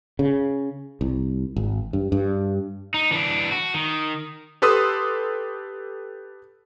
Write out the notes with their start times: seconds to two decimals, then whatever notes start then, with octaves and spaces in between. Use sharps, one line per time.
0.19 C#3
1.01 C2
1.56 G#1
1.93 G2
2.12 G2
2.94 D#4
3.11 E3 D4
3.51 F#4
3.74 D#3
4.62 G4 A4 B4 C6 D#6 E6